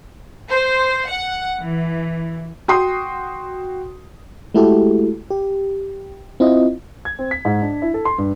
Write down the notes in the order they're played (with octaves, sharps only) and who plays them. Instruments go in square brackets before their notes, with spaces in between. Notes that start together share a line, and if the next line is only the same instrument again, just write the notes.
[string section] C5
F#5
E3
[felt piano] F#4 G5 C6 D#6
[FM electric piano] G#3 A3 E4 F#4 G4 A4
G4
C4 E4 F4 D#5
[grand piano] G#6
C4
B6
G#2
D4
E4
A4
C6
G2